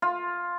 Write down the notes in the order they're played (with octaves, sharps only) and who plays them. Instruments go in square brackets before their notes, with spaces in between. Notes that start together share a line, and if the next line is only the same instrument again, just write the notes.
[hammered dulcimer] F4